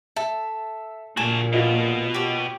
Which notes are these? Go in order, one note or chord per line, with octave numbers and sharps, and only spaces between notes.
A4 E5
A#1 A#2 F#4 G#5 A5
B2 F4 D#5 D7
G4 C#5